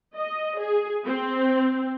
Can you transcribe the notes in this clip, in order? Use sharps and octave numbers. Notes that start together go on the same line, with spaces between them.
D#5
G#4
C4